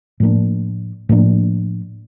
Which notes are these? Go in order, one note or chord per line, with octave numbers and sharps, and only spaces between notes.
A2 F3 A#3 D4
A2 F3 A#3 D4